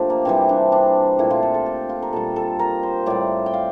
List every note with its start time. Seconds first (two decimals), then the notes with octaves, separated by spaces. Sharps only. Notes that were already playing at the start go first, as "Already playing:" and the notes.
Already playing: A#2 F3 A3 D4 G4
0.10 A#3
0.25 C3 E3 G3 C4
0.49 D4
0.72 D4
1.19 A#2 A3 E4
1.30 F4
1.42 A4
1.54 A4
1.66 G4
1.89 F4
2.02 A#4
2.13 A#2 G3 A4
2.36 A4
2.59 A#4
2.83 C5
3.06 A2 G3 D5
3.46 G5
3.54 F5